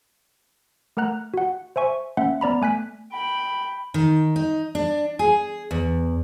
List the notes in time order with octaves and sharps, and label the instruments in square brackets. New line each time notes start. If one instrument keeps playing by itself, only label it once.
[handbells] A3 A#4 F#5 A#5 F#6
F#4 F#5
C5 E5 G#5 C#6
A#3 C#4 E5 F#5
B3 D5 A#5 B5
A3 G#5 F#6 B6
[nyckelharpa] G5 B5
[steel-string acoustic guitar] D#3
D#4
D4
G#4
E2